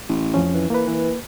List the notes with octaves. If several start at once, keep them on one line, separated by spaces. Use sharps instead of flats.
A1
F2 F3 C#4
E3
E3 A#3 B4
E3